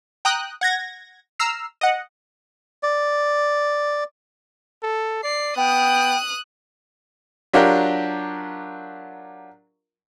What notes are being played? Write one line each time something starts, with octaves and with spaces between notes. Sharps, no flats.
G5 A#5 D#6 F#6
F#5 G#6 A#6
A#5 E6 F6 C7
D#5 F#5
D5
A4
D5 C7
B3 G5 D#6 F#6
F#3 D4 F4 G4 A#4